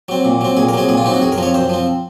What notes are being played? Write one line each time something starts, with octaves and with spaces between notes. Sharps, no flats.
F#3 C4
A#2
F#3 C4
A#2 G#4
A#4
F#3 C4 G#4
A#2 G#4
F4
F#3 C4 D#4
F#4
F#2 G#4
A#4
F3 C4 C#5
F#2 C5
F3 C4